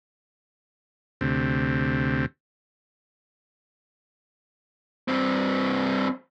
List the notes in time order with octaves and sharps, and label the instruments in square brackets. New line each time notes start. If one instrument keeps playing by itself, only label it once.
[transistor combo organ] D2 C3
[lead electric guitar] G2 C4